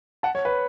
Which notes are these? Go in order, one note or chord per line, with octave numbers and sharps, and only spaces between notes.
F#5 A5
C#5
B4